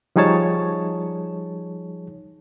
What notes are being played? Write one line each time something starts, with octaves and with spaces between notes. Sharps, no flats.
F3 G3 D#4 G#4 C#5 A5